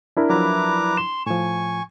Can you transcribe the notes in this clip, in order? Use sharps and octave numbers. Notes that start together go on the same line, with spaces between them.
D4 E4 A#4
F3 F#3 B4 A#5 D6
C6 E7
A2 F3 G#5 C#6